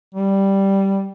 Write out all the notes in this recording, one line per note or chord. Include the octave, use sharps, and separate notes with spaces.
G3